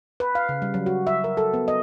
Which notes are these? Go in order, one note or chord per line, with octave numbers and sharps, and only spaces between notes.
B4
F5
C#3
G3
F#3
F#4
E5
A#4
A4
B3
D#5